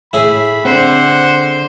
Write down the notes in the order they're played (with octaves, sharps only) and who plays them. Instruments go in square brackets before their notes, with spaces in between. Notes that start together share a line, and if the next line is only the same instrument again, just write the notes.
[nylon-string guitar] A2 [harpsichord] E4 G#4 [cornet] B5
[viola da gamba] D3 C5 [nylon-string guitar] C4 [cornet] F#5